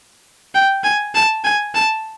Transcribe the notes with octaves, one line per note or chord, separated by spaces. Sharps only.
G5
G#5
A5
G#5
A5